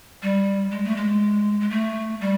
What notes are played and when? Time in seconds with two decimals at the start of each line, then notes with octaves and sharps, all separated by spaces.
0.22 G3
0.71 G#3
0.84 A3
0.96 G#3
1.61 G#3
1.70 A3
2.21 G3